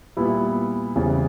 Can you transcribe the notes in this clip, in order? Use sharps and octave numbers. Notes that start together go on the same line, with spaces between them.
A#2 G3 B3 E4
E2 C#3 E3 G3 C4